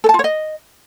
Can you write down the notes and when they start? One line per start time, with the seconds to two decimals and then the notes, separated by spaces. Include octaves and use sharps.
0.04 A4
0.09 A5
0.14 F4
0.19 C#5
0.24 D#5